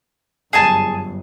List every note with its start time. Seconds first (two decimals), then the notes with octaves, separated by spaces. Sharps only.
0.53 G1 F#2 G#4 G#5 A5